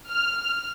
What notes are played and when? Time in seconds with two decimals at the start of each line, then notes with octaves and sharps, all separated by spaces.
0.10 F6